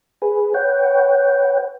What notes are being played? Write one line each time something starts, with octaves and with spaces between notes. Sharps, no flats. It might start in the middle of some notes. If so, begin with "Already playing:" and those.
G#4 B4
B4 C#5 F#5 G5